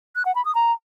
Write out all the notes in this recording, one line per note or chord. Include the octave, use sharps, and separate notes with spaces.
F#6
F#5
B5
D#6
A#5